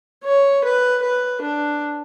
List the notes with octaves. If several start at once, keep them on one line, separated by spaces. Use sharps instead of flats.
C#5
B4
B4
D4